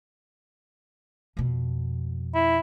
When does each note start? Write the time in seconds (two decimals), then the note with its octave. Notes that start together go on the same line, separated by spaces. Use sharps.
1.37 F2 B2
2.34 E4